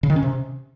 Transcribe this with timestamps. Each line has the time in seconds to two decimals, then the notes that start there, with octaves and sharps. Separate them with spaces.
0.03 C#3
0.10 D#3
0.16 C#4
0.23 C3